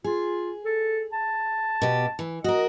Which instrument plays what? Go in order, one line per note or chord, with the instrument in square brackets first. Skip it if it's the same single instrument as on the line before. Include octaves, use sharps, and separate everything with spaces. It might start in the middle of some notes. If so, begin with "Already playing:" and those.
[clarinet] F4 [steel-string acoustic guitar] G#4
[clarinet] A4
A5
[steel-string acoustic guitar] B2 G4
E3
[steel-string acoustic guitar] F#4 A#4 [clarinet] D#5